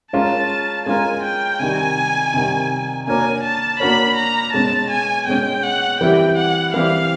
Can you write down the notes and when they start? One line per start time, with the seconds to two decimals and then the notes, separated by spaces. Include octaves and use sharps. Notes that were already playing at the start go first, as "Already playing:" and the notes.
0.13 G#3 C#4 F4 A#4 A5
0.86 G#3 C#4 F4 A#4 G#5
1.23 G5
1.59 C3 D#3 G3 G#5
2.34 C3 D#3 G3
3.07 A#3 D4 F#4 A#4 C#5 G#5
3.44 A5
3.80 A#3 D4 F#4 A#4 C#5 B5
4.17 A#5
4.53 B2 G#3 C#4 A5
4.91 G#5
5.27 B2 G#3 C#4 G5
5.64 F#5
6.01 E3 G3 C4 E4 G4 G5
6.37 F#5
6.74 E3 G3 C4 E4 G4 F5